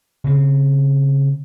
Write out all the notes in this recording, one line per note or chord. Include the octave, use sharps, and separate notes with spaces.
C#3 C4